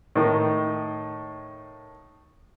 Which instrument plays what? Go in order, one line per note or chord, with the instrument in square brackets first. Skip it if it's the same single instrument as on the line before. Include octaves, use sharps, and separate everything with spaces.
[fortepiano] A2 D#3